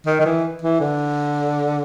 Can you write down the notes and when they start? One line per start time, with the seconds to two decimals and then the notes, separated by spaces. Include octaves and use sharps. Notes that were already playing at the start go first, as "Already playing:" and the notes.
0.06 D#3
0.20 D#3
0.26 E3
0.62 E3
0.80 D3